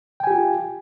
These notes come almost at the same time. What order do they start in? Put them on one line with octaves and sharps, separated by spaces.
G5 G#5 G4 F4